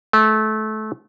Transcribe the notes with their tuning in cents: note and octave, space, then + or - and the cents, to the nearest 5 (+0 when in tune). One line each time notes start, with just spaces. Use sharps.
A3 -25